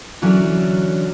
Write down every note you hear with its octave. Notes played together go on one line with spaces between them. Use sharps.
D3 E3 F#3 C#4 D4